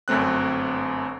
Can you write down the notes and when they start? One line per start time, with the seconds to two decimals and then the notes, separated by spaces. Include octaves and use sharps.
0.08 G1 F#2 A3 C4 F#6